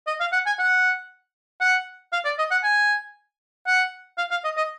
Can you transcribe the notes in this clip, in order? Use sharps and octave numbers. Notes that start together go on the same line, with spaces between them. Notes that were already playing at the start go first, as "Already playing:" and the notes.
D#5
F5
F#5
G#5
F#5
F#5
F5
D5
D#5
F#5
G#5
F#5
F5
F5
D#5
D#5